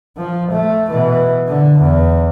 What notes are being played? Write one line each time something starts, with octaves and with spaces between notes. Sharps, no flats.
F3
A3
B2 E3
D3
E2